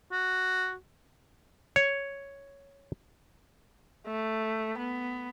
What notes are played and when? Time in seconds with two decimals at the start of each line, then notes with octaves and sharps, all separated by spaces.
0.12 F#4
1.76 C#5
4.07 A3
4.78 B3